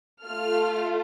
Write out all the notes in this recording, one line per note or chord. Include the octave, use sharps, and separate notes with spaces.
A3 F4 A4 F6